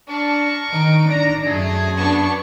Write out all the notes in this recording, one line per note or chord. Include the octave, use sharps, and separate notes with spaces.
D4 A#4 C#6
D#3 D#4 D7
D4 A#5
F#2 A3 G#4
B3 D4 C#6